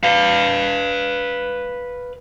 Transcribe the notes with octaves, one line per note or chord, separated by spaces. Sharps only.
B4 F5